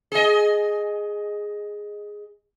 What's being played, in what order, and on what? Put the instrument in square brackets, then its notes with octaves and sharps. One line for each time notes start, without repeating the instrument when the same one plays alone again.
[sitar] G#4 D#5